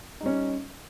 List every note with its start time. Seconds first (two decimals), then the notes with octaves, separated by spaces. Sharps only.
0.21 D#4
0.23 G3
0.26 C#4